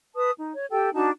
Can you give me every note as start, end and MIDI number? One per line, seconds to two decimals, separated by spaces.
0.15 0.31 71
0.15 0.31 81
0.15 0.31 87
0.37 0.52 63
0.54 0.66 73
0.70 0.92 67
0.70 0.92 69
0.70 0.92 79
0.93 1.09 62
0.93 1.09 63
0.93 1.09 66
0.93 1.09 81